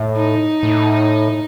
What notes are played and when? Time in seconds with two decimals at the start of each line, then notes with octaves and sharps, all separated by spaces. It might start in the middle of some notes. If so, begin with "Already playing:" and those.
Already playing: A2
0.16 D#4
0.63 A2